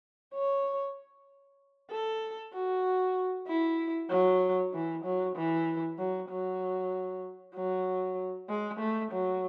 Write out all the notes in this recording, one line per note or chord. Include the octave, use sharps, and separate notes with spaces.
C#5
A4
F#4
E4
F#3
E3
F#3
E3
F#3
F#3
F#3
G#3
A3
F#3